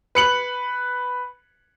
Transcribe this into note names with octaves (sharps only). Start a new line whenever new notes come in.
B4 C#7 F#7